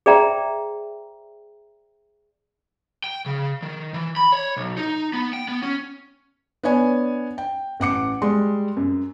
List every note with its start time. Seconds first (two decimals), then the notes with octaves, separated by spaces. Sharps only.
0.06 G#4 C5 D5 E5 G5 A#5
3.04 G5
3.26 C#3
3.63 D#3
3.94 E3
4.16 B5
4.32 C#5
4.57 B1
4.77 D#4
5.13 B3
5.33 G5
5.49 B3
5.63 C#4
6.63 B3 D4 C#5 G#5
7.38 G5
7.80 A1 F#5 D6 C#7
8.22 G3 G#3 C6
8.77 F#2